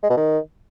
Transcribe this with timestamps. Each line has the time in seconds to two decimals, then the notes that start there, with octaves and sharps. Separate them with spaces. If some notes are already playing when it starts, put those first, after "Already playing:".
0.03 G#3
0.10 B2
0.17 D#3